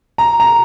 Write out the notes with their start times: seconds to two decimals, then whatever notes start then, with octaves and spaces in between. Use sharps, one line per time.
0.18 A#5
0.40 A#5